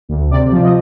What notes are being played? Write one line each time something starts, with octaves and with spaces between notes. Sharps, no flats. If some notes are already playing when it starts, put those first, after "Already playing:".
D2
C3 D5
F3
D#5